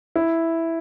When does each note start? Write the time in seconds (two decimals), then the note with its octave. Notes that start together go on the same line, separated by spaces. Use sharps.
0.16 E4